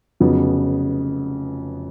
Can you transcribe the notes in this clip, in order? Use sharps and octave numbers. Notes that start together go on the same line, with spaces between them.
F1 F2 C#3 F#3 B3